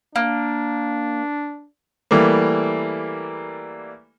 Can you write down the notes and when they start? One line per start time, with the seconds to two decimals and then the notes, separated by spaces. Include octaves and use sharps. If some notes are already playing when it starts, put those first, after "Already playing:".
0.16 A#3 D4
2.11 E3 G3 A3 A#3